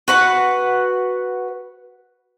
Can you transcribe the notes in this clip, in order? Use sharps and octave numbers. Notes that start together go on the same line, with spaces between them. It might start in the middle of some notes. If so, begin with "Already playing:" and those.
F#4 B4 F#5